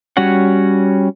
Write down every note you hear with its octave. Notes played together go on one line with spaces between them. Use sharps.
G3 C#4 F#4 C#5 F#5